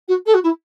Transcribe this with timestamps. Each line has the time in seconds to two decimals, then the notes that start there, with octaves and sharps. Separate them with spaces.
0.08 F#4
0.26 A4
0.34 F#4
0.43 E4